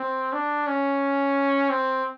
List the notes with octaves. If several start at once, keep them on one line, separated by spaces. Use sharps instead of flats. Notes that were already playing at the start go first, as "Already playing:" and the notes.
Already playing: C4
D4
C#4
C4